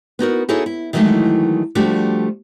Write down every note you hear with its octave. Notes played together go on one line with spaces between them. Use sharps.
B3 D#4 F#4 A#4
D#4 E4 F#4 G#4 A4 C#5
E4
D#3 E3 F#3 G#3 A3 D#4
F3 G3 A3 D4 F#4 G4